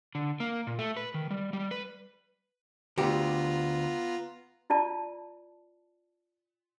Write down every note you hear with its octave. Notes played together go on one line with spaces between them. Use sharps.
D3
A#3
A#2
A3
B4
D#3
G3
G3
B4
D2 B3 F4 G4 A#5
E4 F4 D5 A5